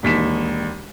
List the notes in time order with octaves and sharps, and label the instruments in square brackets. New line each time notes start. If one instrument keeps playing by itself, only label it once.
[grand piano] E1 D#2 B6 E7